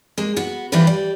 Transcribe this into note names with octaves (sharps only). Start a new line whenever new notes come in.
G#3 A#3
B3 F#4
E3 F3 G3 G4 B4
G3